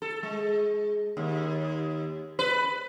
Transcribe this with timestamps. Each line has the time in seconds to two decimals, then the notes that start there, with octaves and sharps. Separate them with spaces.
0.02 A4
0.23 G#3
1.17 D#2
2.39 B4